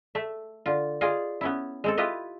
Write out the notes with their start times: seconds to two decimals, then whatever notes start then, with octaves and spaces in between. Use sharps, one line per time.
0.15 A3 E5
0.66 D3 F4
1.01 F4 G#4 D5 D#5 F5
1.41 B3 C#4 E4
1.84 G#3 C4 A4
1.97 E4 F4 G4 B4 D#5